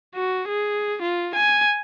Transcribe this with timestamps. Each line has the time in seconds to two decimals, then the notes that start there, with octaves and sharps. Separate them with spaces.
0.15 F#4
0.48 G#4
1.02 F4
1.35 G#5